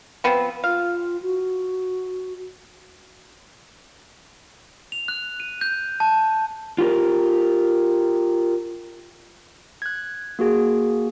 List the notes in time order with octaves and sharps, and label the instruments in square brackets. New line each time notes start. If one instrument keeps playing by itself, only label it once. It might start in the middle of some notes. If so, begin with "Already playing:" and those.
[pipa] F3 B3 C4
[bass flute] F4 [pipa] F5
[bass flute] F#4
[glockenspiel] F7
F#6
D#7
G6
A5
[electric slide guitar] F4 G4 A#4
[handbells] F#6 G#6
A#3 F#4 G#4